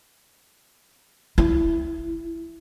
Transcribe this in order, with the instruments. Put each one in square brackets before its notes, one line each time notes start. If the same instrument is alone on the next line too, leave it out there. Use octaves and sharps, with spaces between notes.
[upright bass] E4